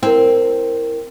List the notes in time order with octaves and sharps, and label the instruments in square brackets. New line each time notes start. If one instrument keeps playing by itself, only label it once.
[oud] C4 [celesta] E4 A#4